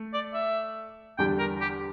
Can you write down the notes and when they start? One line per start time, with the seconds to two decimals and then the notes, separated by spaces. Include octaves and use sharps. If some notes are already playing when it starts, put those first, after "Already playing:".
Already playing: A3
0.14 D5
0.34 E5
1.18 E2 D3 G3 D4 G5
1.39 A#4
1.61 G4